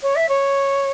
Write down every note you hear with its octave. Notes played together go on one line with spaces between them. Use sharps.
C#5
E5
C#5